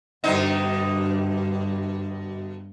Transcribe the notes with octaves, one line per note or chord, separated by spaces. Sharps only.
G2 B2 D3 D#4